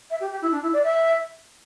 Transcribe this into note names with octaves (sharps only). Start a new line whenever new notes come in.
E5
G4
G4
E4
D4
E4
D5
E5